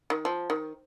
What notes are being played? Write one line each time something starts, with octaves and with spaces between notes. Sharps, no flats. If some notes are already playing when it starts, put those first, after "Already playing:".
D#3
F3
D#3